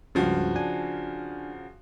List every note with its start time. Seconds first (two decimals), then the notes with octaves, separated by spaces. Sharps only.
0.15 C#2 G2 C#3 F3 F#4
0.55 D4 G#5